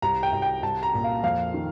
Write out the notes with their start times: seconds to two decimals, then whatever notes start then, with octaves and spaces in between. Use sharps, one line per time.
0.02 C2 A#5
0.23 G5
0.33 C2
0.42 G5
0.62 C2 A5
0.83 A#5
0.94 A#2
1.04 F5
1.23 F2 F5
1.54 D#3